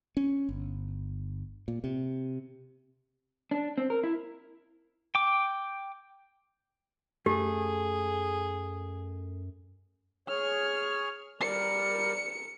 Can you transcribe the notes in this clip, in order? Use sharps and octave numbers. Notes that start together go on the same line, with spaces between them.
C#4
G1
A#2
C3
D4
C4
A#4
E4
G5 D6
F#2 A3 G4 G#4
G#4 C#5 F6
G3 A#4 D5 C#7